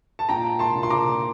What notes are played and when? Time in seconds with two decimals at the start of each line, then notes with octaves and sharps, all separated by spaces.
0.19 A5
0.29 A#2 G5 A#5
0.59 A5 C6
0.75 A#2
0.83 C6
0.90 A#5 D6